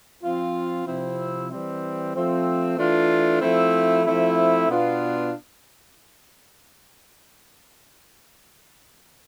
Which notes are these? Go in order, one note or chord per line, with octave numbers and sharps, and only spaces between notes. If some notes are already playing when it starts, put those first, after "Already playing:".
F3 C4 F4
C3 F3 C4 E4
E3 G3 C4
F3 A3 C4
E3 A3 D4 F4
F3 A3 C4 E4
F3 A3 C4 E4
B2 B3 D4 F4